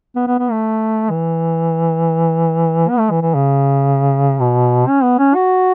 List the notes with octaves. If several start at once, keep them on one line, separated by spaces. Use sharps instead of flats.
B3
B3
B3
A3
E3
B3
A3
E3
E3
C#3
B2
C#4
B3
C#4
F#4